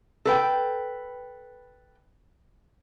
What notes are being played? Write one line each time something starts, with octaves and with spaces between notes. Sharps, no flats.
A4 B4 G5